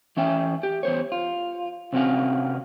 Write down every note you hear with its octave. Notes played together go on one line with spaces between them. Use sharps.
E3 C#4 E5 G5
G4
E2 C5 C#5
F4
C3 C4 C#4 F#4 F5